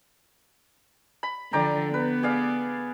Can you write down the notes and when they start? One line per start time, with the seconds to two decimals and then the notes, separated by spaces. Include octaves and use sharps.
1.23 B5
1.53 D3 F3 D5 G5 A#5
1.94 B3 B4
2.23 G#4 D5 F5